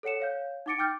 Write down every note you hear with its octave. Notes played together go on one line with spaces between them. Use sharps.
A4 C#5 F#5 C#7 E7
C#5 F5 G6
D#4 F#5 D6 A6 C#7 D7
G5 D6 F6 G6 A6